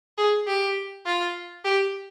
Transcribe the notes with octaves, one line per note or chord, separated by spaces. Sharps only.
G#4
G4
F4
G4